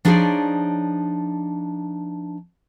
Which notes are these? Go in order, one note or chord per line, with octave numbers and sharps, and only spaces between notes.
F3 D4 D#4 G#4 C#5 D5